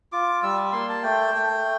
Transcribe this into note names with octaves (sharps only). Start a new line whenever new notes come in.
F4 D6
G3 E6
A#3 C6
A5
A3 G5
A3